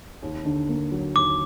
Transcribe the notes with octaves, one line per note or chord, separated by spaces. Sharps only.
D#2
D3
A#3
F#3
D#2 D6